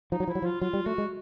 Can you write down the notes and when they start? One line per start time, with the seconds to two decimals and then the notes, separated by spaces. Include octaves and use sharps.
0.12 F3 D#4
0.20 F#3
0.28 F3 E4
0.35 F#3
0.42 F3
0.45 F4
0.61 F#3 F4
0.73 G3
0.86 A3 F#4
0.98 G#3